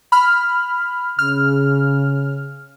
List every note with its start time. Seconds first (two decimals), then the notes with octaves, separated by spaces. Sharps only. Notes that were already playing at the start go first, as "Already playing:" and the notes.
0.12 B5 F6
1.19 C#3 F6